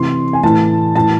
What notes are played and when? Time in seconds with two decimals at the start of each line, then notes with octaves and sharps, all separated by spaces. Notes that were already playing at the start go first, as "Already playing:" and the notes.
Already playing: C3 E3 C6
0.33 G#5
0.43 A2 E3 A5
0.95 A2 E3 A5